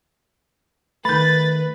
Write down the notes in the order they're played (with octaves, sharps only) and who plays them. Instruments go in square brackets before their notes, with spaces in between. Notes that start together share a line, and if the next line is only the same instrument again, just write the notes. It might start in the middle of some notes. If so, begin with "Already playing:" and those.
[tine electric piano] D#3 A3 [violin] B4 [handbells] B5 G6 [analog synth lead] A6